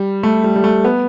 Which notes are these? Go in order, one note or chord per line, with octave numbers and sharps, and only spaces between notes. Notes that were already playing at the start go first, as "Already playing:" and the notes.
Already playing: G3
A3
G3
G3
A3
B3